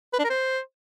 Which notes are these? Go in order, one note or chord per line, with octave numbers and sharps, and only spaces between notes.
B4
D4
A#4
C5